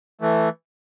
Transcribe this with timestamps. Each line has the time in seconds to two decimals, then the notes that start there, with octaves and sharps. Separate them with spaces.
0.21 E3 A3